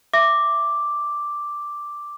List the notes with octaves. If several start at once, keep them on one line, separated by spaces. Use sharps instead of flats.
E5 D6